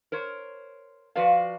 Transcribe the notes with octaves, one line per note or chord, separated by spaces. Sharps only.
A#4 C5 C#5
F3 F#4 B4 D5 F5